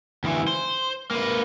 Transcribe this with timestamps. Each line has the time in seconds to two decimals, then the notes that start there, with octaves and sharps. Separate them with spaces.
0.24 D2 E3
0.48 C5
1.11 A#3 B4